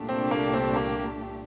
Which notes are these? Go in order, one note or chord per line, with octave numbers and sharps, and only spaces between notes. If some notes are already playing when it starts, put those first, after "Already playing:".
Already playing: C2 A#2 A3 D4 G4
C4
A#3
C4
A#3